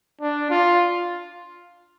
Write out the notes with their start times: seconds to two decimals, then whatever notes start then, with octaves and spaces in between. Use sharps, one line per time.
0.21 D4
0.51 F4